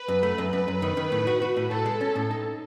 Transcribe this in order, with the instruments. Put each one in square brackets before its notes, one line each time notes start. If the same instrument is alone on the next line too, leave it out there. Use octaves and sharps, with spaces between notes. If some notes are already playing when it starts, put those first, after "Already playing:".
Already playing: [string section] B4
[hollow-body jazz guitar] F#2
A3
F#2
[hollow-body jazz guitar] F#2 [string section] B4
[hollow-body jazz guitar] F#2
D#3
D#3
A2
F#4
F#4
A2
[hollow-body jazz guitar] A2 [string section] A4
[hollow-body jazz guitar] G#3
C#4
A2
D#4